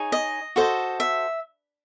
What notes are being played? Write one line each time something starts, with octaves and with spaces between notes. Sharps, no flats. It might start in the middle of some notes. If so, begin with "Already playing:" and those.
Already playing: D#4 G#4 C#5
D#5
F#4 A4 C5 D#5
E5